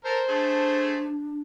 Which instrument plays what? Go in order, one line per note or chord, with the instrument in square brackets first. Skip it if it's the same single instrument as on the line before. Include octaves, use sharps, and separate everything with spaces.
[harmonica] A4 A#4 [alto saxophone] C5
[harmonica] A3 G#4 A4 [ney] D4